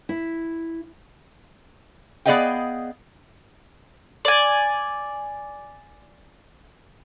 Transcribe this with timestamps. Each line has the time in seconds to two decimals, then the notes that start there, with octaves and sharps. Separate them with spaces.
0.09 E4
2.26 B3 G#4 D5 D#5 F5 G5
4.25 D5 G#5